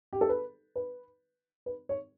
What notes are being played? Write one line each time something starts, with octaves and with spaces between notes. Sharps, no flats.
G4
A4
B4
B4
B4
C#5